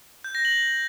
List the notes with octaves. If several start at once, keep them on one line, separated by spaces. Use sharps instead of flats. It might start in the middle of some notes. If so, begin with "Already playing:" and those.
G6
A#6
F#7